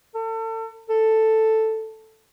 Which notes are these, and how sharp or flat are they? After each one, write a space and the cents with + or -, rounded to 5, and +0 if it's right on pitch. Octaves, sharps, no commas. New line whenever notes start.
A4 +35
A4 +5